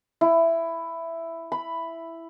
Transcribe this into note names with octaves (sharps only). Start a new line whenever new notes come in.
E4
B5